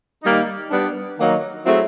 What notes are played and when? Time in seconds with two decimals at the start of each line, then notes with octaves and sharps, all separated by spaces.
0.23 D#3 G3 A#3 D#4
0.70 G3 B3 D4
1.17 D#3 F#3 A#3 D#4
1.64 F#3 A3 C4 E4 G#4